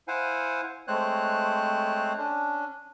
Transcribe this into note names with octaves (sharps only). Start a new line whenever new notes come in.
E4 C5 F5 F#5 G#5
G#3 A3 C4 C5 C#5 F#6
C#4 D4